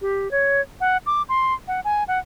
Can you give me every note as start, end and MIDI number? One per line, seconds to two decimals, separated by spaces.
0.02 0.30 67
0.31 0.61 73
0.81 0.97 78
1.06 1.22 86
1.29 1.54 84
1.68 1.80 78
1.84 2.04 80
2.08 2.19 78